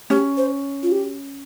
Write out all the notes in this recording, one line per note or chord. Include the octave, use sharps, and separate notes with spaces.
C#4 G4
C5
F4
G4